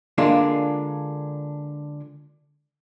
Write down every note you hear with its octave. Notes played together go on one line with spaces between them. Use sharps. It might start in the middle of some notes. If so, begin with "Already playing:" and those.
D3 G#3 A#3 D4 F4